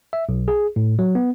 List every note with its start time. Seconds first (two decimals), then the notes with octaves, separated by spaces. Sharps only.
0.13 E5
0.29 B1
0.48 G#4
0.76 A2
0.99 F#3
1.15 B3